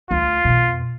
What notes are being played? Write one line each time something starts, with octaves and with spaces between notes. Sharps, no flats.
D2 F4
F2 B2